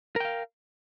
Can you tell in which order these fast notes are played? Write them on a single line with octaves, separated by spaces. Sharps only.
A#4 G5 F5